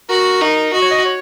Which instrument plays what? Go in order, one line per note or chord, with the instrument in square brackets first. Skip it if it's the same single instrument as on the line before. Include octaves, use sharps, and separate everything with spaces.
[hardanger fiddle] F#4 [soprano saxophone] A#4
[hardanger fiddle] D#4 [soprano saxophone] A#4
[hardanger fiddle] F#4 [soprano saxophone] D#5
[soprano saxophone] C#5
D#5
C#5